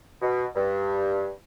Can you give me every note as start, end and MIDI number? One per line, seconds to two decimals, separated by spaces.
0.21 0.44 47
0.56 1.28 43